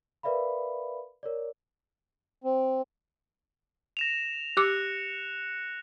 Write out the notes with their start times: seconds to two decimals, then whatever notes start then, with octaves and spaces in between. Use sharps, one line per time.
0.23 A#4 B4 D5 E5 F5 B5
1.23 A#4 C#5 D5
2.44 C4
3.97 A#6 E7 F7
4.57 G4 D6 F#6 C#7